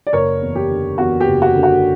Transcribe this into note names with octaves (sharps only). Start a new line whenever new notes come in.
D5
F#1 A#4 C#5
E2
G4
D3
E2 F#4
G4
F#1
F#4
D3
F#4